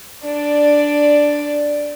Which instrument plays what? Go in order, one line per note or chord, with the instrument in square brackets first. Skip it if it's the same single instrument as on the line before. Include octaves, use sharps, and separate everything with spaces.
[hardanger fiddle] D4 D5